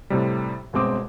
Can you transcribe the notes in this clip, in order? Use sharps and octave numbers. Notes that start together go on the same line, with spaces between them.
A2 C3 G3
G1 B2 G#3 C4 D6 D#6